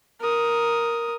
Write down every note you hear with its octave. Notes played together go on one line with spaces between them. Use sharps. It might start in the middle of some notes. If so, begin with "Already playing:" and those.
A#4 D#6